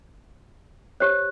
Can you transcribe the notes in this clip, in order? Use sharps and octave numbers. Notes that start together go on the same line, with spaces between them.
G4 C5 C#5 F#6